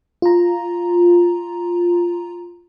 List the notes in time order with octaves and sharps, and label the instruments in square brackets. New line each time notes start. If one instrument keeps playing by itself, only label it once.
[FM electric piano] F4 A#5